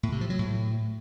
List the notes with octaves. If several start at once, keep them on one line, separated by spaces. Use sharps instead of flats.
A2
C3
F3
F#3
A2